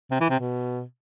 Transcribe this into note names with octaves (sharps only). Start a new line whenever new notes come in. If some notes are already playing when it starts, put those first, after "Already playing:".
C3
E3
C3
B2